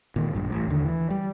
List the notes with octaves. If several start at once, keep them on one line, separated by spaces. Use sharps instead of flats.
A#2 D#3 G#3
A#1 G2
A1
D#2 D3
E3
G3